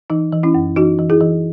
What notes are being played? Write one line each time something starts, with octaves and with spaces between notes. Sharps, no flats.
E3 D#4
E3
C#4 E4
F#2
E3 D#4 F#4
E3
E4 G#4
E3